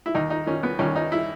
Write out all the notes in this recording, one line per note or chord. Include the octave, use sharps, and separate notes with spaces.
E4
D#2 D#4
D#4
D#3 C#4
B3
D#2 C#4
D#4
E4